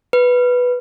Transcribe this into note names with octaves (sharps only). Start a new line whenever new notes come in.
B4